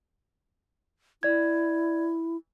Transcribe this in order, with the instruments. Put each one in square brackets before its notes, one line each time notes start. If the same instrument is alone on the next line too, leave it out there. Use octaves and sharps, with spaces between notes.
[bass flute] E4 [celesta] D5 G#6